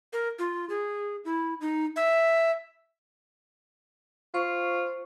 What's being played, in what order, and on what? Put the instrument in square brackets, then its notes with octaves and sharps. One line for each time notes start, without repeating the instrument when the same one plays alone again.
[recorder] A#4
F4
G#4
E4
D#4
E5
[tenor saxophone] F4 [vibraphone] C5 C#6